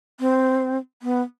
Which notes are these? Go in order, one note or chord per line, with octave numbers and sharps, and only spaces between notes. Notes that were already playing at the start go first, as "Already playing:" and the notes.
C4
B3